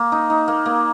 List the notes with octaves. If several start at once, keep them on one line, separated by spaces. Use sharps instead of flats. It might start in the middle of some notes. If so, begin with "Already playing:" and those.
Already playing: A#3
D#4
D#4
A#3
A#3